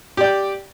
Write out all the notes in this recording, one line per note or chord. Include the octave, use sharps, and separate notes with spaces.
G4 D5 G5